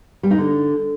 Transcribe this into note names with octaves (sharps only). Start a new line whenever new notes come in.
G3
D#4
D3